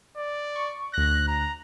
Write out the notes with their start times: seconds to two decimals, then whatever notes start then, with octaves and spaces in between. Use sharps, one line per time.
0.17 D5
0.56 C#6
0.94 D2 F#6 A#6
1.27 A#5